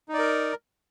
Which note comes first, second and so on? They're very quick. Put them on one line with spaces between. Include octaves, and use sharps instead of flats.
D#4 D5 A#4